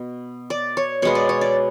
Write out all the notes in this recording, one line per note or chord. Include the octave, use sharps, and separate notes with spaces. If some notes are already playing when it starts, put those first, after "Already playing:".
Already playing: B2
D5
C#5
B2 G#3 B3 C#5
D5
C#5
D5